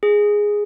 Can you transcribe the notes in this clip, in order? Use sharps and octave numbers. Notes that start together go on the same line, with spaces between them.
G#4